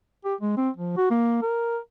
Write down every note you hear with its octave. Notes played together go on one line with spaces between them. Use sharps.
G4
G#3
C4
F3
F#4
A#3
A#4